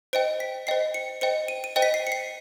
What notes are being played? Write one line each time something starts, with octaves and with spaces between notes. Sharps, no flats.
C5 D#5 G5 D7
B6
C5 D#5 G5 C7
C#7
C5 D#5 G5 C#7
D#7
D#7
C5 D#5 G5
B6
C7
C#7
C7